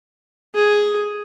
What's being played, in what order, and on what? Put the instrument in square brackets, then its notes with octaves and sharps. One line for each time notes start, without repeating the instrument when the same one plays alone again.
[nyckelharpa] G#4